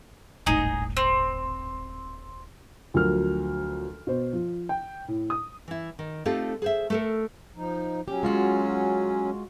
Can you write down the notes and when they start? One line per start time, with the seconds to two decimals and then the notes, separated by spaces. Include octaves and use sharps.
0.46 D#1 G#1 A2 D#4 G#4 A#5
0.97 C4
2.94 D2 F3 F#3 A#4 F6
4.07 B2 C5
4.33 F3
4.69 G5
5.08 A2
5.30 D#6
5.68 E3 E4
5.99 D#3
6.25 A3 C4 D#4 F4 G4 A4
6.62 G#4 C5 E5
6.90 A3 A4 A#4
7.56 F3 D#4
8.08 F#3 C#4 G4
8.23 G#3 F4 F#4